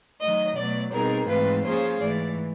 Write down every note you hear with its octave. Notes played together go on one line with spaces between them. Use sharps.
D#3 F#3 A3 D#5
B2 F#3 A3 D5
B2 G3 C4 D#4 G#4 A#4
G#2 E3 A3 C4 F4 B4
F3 A#3 C#4 F4 G#4 C5
G#2 E3 A3 D5